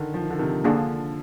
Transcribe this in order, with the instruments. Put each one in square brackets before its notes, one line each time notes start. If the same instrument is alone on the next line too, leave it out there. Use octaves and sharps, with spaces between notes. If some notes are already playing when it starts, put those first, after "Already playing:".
Already playing: [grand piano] D3 D#3
F3
D#3
D3
C3 D#3
[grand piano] D3 F3 [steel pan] A#3 D4 F4 G#4